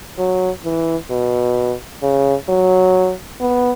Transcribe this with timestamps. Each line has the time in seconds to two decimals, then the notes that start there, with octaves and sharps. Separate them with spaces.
0.18 F#3
0.64 E3
1.11 B2
2.02 C#3
2.49 F#3
3.40 B3